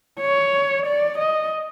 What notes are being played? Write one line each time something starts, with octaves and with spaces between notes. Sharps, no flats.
C#5
D5
D#5